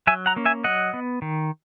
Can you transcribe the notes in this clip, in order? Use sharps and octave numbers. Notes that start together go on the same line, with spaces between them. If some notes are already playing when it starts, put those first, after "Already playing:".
F#3 E5 G#5
F#5 A#5
A#3 C#4
E5 G#5
F#3 D#5 F#5
B3
D#3